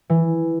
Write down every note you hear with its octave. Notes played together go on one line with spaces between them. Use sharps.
E3